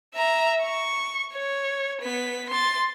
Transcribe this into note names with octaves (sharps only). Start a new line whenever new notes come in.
E5 A#5
C#6
C#5
B3 B6
C6 A6